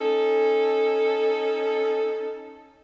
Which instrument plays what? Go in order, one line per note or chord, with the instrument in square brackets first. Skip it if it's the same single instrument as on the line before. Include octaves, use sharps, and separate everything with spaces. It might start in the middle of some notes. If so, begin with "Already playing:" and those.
[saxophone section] C#4 D#4 A4